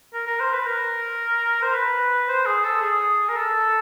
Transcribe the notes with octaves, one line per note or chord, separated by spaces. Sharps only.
A#4
A#4
C5
B4
A#4
C5
B4
C5
G#4
A4
G#4
A#4
A4